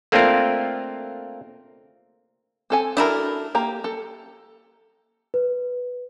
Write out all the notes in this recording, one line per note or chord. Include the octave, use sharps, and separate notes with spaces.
A3 A#3 C4 D4 F4 A#4
C4 A4 G#5
A3 D4 E4 F#4 A4 A#4
A#3 G4 A#5
A4
B4